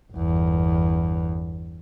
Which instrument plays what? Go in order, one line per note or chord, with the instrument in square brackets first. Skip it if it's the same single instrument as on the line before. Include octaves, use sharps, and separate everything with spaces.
[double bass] G1 E2